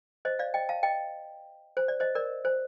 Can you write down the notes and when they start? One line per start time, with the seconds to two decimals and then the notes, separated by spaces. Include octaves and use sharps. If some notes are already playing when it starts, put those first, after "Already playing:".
0.25 C5 D#5
0.39 D5 F5
0.54 D#5 G5
0.69 F5 A5
0.83 D#5 G5
1.77 C5
1.88 D5
2.00 C5 D#5
2.15 A#4 D5
2.45 C5